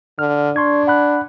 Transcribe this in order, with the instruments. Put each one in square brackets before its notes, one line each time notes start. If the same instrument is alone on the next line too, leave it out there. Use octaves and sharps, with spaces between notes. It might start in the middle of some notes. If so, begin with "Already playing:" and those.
[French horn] D3 [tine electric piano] F6
[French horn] D4 [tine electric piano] C6 C#6 G#6
[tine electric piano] F#5 B5 F#6